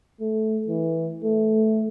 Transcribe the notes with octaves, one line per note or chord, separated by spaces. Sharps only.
A3
E3
A3